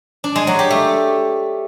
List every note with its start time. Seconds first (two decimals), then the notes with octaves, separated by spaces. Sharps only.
0.24 D4
0.36 G#3
0.47 F#3
0.59 G4
0.70 A3